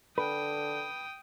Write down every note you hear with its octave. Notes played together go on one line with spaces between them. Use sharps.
D3 B4 G5 D#6